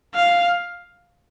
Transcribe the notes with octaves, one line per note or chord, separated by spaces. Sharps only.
F5